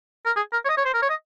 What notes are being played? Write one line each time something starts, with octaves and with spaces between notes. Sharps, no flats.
A#4
G#4
A#4
C#5
D#5
C#5
C5
A#4
C#5
D#5